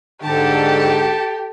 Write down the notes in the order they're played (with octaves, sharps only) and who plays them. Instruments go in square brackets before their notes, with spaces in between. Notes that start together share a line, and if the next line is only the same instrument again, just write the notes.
[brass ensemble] G#2 D3 [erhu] G4 [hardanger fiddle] A4 A5